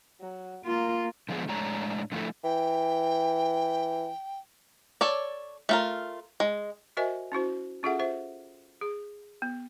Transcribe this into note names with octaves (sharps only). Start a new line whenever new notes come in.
F#3
A#3 F4
D3 F3 G#3 B3 G#4
A2 G#3 D4 C#5 A#5
D3 F3 A3 E4 A4
E3 G5
A4 C#5 D5
A3 F4 A#4
G#3
F#4 A#4 C5 D#5 E5 G#5
C#4 E4 F#4 C5
C#4 F4 G#4 A4 E5 F#5
F4 C5 E5
G#4
B3